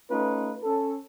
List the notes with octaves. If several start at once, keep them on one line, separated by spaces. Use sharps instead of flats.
A3 C#4 D#4 F4 B4
C#4 A4